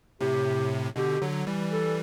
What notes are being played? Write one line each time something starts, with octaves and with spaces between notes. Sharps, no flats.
A2 C3 G4
B2 D3 G4
D3 F#3
E3 G3
A4